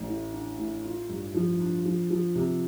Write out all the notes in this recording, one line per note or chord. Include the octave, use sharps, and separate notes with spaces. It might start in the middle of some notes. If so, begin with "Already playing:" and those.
Already playing: A1
A2
D4
A2
F4
G2
F3
D4
F3
F3
C3